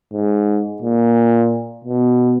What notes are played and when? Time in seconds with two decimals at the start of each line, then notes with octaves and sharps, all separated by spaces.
0.13 G#2
0.82 A#2
1.85 B2